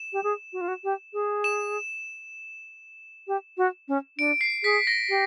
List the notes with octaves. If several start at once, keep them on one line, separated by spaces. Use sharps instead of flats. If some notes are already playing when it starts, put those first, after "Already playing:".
Already playing: E7
G4
G#4
F#4
F4
F#4
G4
G#4
E7
G4
F#4
C#4
D4 D7
C7
G#4 B6
A#6
G4